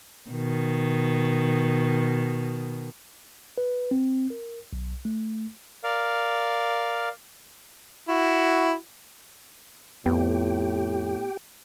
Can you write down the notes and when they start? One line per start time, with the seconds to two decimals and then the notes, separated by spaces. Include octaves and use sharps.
0.30 B2 D#3
3.58 B4
3.91 C4
4.30 A#4
4.73 B1
5.05 A3
5.84 A#4 D5 F5
8.08 E4 F#4
10.06 F2 A2 B3 G4 G5